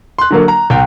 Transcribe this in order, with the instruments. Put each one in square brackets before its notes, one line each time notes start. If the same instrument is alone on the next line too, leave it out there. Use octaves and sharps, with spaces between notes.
[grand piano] C6 F#6
D3 F#3 A#3
A#5
C2 G5